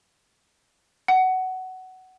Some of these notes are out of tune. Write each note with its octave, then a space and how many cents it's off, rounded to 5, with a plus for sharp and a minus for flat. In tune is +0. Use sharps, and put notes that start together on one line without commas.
F#5 +15